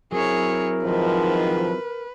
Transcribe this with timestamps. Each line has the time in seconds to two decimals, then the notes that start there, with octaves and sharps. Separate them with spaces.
0.12 F#3 C4 E4 G#4 A#4 C#5
0.84 G#2 D#3 F3 B4